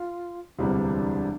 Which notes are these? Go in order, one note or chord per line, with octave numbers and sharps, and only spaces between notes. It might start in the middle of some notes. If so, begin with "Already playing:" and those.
Already playing: F4
E1 D2 C3 E3 G3 D4